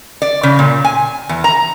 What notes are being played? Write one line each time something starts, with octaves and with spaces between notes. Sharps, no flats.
D5
C#3
A#2
G#5
E2
A#5